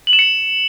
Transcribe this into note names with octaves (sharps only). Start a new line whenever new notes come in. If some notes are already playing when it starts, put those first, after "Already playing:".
F#7
E7
C#7